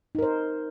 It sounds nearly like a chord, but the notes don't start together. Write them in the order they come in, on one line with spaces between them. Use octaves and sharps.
D#4 A#4 C5